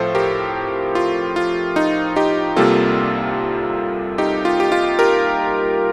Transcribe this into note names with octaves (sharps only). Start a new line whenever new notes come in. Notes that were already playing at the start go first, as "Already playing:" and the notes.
Already playing: A2 F3 C4 F4 A4 C5
G4 A#4
F4
F4
D#4
D#4 G4
C2 C3 G3 A#3 F4 A4
D#4 G4
F4
G4
F4
G4 A#4